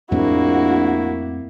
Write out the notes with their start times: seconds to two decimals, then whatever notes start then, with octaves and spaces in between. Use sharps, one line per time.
0.11 A#1 F2 A2 A#3 C4 E4 F#4